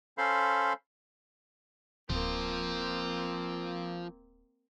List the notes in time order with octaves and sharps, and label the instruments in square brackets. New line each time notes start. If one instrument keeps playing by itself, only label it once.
[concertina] C#4 A4 C5 F5 B5 C6
[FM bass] D1 [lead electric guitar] F3 C5 [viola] A#3 C4